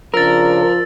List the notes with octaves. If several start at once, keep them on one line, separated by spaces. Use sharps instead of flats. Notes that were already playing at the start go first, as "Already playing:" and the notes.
C#3 F3 D4 A#4 E6 A6